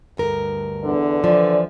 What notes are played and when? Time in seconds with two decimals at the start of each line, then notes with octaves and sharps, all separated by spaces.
0.17 D2 G2 A#4
0.84 E2 D3 D4 B4
1.24 E3 F3 D5